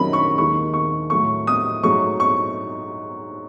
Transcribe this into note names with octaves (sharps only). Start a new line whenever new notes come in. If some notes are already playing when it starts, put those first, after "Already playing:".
Already playing: F#2 D#3 F#3 A3 B5
C#6
D#2 D#3 G#3 C#6
C#6
A2 F#3 A3 C#6
D#6
G#2 F#3 A3 C#6
C#6